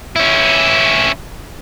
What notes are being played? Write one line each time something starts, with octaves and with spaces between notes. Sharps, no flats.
C#4 E4